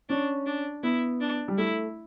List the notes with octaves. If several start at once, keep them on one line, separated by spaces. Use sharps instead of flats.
C#4 D4
D4
B3 E4
D4
G3
A3 E4